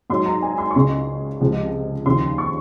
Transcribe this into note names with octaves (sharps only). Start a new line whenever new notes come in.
G#2 F#3 C6
A#5
G#5
C6
C#6
C#2 C#3 G#3 C6
C#2 C3 F3 G#3
D#2 C#3 F3 C6
C#6